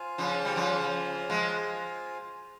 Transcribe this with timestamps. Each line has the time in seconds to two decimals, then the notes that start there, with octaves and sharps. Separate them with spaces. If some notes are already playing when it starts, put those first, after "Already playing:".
Already playing: F4 C5 F5 G#5
0.18 C#3 F3
0.45 G3
0.56 C#3 F3
1.30 F3 G#3